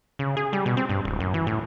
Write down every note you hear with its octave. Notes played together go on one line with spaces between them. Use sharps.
C#3
G#4
G3
B2
C4
G2
D1
F#2
E3
A2